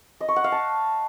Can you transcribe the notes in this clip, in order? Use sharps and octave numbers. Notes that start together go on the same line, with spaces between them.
D#5
C#6
F#5
F5
A5